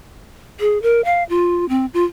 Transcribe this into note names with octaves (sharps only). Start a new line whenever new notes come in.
G#4
A#4
F5
F4
C4
F4